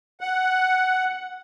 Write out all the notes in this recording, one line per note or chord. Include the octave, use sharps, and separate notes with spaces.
F#5